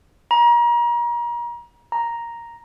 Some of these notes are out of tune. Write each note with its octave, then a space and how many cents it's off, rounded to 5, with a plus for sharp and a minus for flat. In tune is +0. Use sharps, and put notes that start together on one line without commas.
A#5 +35
A#5 +0